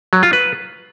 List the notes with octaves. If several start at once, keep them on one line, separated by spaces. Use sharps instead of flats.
F#3
F4
B4